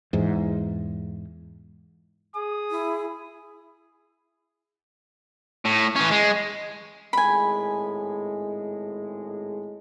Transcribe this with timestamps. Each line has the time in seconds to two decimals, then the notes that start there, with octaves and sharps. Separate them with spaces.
0.13 E2 G#2
2.35 G#4 D#6
2.71 E4
5.65 A2
5.96 E3 C#4
6.11 G#3
7.13 G#1 A2 G#3 G#5 B5